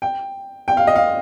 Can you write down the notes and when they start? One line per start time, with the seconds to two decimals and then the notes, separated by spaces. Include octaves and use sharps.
0.02 G5
0.68 G5
0.77 F5
0.87 D#5
0.96 F5